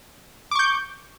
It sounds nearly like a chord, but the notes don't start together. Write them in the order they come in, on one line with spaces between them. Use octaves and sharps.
D6 C#6 G6